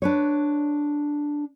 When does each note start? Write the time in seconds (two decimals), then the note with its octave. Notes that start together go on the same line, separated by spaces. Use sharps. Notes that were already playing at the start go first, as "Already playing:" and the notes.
0.02 D4 B4 C#5